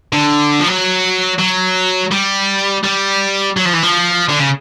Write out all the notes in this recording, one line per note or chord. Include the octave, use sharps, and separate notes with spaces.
D3
F3
F#3
F#3
G3
G3
F#3
F3
E3
F3
D3
C#3